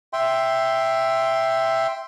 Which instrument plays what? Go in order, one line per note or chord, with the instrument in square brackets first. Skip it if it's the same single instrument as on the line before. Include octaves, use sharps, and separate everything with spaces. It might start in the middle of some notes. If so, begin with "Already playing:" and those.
[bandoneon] E5 G5 C6